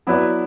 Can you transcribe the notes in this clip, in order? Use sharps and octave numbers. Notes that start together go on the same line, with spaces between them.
F#3 B3 E4 B4 D5